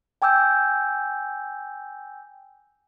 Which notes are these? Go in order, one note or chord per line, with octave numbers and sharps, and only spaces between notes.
G5 G#5 D6 E6 G6